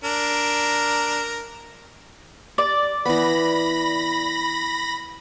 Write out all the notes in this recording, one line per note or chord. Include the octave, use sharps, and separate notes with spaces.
D4 A#4
D5
E3 B3 B5 A#6